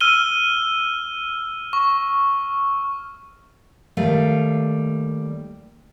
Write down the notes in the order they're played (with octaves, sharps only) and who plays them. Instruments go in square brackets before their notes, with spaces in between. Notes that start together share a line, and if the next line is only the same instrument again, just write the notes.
[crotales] E6 F6 D#7 G7
C#6
[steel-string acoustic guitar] D#2 G3 A3 F5